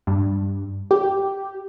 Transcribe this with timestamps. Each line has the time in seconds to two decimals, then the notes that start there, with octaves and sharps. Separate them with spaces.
0.07 G2
0.91 G4